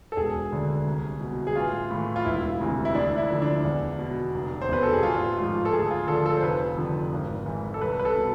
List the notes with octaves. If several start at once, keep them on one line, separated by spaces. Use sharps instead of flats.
A4
E1 G#4
D2 D3
C2
B2
G#4
A1 F4
A2 E3
F4
E1 E4
D2 C3 E3
E4
D2 D4
E4
D3 F3
D4
E2
B2
F1
C5
E2 B2 B4
A4
G#4
A1 F4
G#2 F3 F4
A4
D2 G#4
F4
D3 F3 A4
A4
C5
F1 B4
F2 D3 F3
G#1
G#2 E3
A4
C2 B4
B4
A4
B2